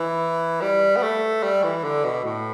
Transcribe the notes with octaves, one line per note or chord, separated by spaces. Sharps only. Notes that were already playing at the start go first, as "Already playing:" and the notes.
Already playing: E3
G3
B3
A3
G3
E3
D3
B2
A2